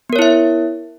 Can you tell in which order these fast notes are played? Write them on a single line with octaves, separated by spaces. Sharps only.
B3 A#4 C#5 E4 E5